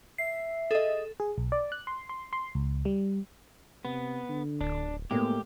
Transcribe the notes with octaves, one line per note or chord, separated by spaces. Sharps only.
E5 C7
G#4 A4 D#5
G#4
B1
D5
F#6
C6
C6
C6
C#2
G3
C3 B3
D3
D1 D4
A2 G#3 A#3 B3 G4